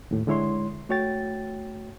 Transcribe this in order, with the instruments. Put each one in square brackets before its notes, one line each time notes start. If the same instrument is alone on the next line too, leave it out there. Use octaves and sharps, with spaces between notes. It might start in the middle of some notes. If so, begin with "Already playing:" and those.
[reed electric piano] D#2 A2
D3 G#3 E4 C#5 C6
A3 F#4 C#5 G5 A6